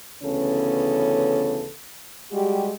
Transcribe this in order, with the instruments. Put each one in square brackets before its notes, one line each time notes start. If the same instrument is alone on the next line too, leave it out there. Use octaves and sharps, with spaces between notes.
[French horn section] D2 C#3 E3 B3 C#4 A4
G3 G#3 F#4 G4